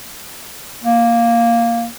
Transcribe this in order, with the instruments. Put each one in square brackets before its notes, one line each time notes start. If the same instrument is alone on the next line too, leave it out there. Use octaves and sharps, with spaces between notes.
[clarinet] A#3